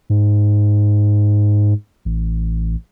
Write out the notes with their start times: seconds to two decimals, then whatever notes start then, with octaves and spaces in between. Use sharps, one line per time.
0.10 G#2
2.05 A1